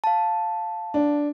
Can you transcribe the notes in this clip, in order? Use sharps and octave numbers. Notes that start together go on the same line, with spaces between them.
F5 A5
D4